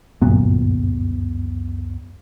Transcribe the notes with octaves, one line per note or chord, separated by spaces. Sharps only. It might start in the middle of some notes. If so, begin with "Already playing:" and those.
G1 C#2 F#2 A#2 F#3 B3